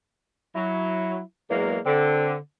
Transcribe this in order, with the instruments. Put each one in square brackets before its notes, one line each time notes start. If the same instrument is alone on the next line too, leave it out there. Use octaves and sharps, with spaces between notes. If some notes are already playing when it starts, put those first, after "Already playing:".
[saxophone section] F#3 [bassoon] E4
[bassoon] E2 [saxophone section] F#3 G#3 A#3
[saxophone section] D3 [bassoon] C4